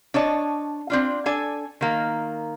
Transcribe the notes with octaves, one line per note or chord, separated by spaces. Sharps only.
D4 C#5 D#5 A5
C4 D4 F4
D4 A4 G#5
D#3 A#3